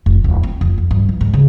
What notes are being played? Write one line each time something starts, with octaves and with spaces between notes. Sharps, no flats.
F1
D1
C4
F1
F2
G2
E3
G#2
C#3